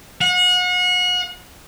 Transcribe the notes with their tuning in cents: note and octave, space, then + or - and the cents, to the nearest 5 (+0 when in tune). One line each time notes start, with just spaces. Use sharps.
F#5 -35